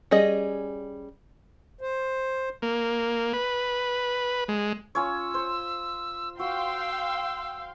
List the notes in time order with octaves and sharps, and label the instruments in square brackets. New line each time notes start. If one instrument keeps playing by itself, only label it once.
[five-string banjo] G3 C#4 G#4 D#5
[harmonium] C5
[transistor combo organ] A#3
B4
G#3
[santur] C#4 F4 C#5 [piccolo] E6
[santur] C5
[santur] F#4 [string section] F5 G5 C6 [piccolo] E6